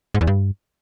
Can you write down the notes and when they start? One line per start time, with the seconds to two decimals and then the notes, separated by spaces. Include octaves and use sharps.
0.15 G#2
0.21 E2
0.27 G2